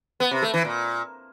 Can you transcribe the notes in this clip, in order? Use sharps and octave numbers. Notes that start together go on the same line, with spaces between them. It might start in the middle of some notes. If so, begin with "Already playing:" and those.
B3
C3
A3
E3
A#2